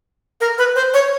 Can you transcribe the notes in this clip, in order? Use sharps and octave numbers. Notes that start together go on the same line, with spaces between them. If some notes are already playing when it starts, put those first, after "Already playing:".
A#4
B4
C5
C#5